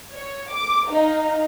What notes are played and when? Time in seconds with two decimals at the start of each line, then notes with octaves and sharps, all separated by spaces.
0.11 C#5
0.51 D6
0.89 D#4 F5